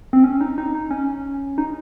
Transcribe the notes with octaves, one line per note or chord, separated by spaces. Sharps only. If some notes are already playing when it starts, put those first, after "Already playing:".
C4
C#4
D#4
D#4
D#4
C#4
D#4